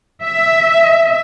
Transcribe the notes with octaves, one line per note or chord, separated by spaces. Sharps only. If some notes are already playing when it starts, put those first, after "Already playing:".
E5